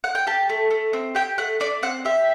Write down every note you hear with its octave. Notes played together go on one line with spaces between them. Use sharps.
F#5
G5
G4 A5
A3
A3
C4
G4 G5
A3 F#5
A3 D5
C4 F#5
G4 E5